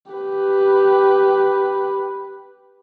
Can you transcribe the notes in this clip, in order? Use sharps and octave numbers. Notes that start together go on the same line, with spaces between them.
G4 B4